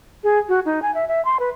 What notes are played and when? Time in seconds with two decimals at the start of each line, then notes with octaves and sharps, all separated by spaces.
0.23 G#4
0.49 F#4
0.65 D#4
0.82 G#5
0.94 E5
1.08 E5
1.25 C6
1.39 B4